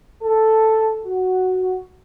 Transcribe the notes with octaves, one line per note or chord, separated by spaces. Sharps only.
A4
F#4